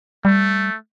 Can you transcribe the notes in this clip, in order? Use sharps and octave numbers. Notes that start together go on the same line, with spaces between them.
G3 A3